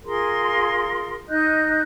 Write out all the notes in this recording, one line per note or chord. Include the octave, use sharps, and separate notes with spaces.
F4 G#4 A#4 C6
D#4 D#5 F#6 G6